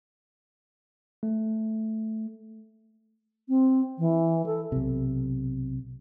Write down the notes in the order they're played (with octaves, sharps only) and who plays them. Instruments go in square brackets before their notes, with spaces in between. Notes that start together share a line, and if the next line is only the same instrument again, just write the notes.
[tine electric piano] A3
[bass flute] C4
E3
A4
[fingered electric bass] B1 C3